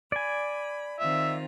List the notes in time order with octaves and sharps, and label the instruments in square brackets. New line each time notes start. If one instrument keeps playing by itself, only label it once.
[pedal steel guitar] D5 G#5 [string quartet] B5
[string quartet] D#3 C4 F4 [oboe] E5